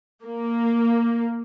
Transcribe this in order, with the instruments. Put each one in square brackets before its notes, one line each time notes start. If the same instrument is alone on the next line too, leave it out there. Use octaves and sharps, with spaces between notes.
[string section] A#3